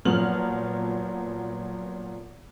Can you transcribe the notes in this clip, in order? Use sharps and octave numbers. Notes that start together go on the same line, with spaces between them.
A#2 F3 F#3 B3 F6 F#7